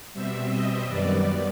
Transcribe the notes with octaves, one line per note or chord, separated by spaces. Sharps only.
B2 G3 C4 E5
D#5
F#2 D#3 G3 B3 D5